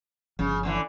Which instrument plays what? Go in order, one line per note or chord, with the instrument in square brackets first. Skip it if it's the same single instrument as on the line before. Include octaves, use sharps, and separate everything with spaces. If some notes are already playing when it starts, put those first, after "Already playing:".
[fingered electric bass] G1 F3 [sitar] C#3
[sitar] A2 D3 E3